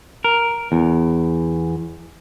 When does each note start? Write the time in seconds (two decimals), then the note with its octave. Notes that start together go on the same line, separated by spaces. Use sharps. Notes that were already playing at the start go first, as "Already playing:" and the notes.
0.24 A#4
0.72 E2